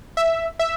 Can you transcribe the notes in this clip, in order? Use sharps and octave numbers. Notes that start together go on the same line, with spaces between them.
E5
E5